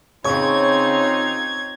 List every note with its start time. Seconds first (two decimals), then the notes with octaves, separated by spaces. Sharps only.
0.24 C#3 C4 D#4 F4 C#5 C#6 G#6